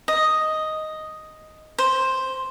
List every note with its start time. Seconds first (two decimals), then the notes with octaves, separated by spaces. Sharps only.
0.08 D#5
1.78 C5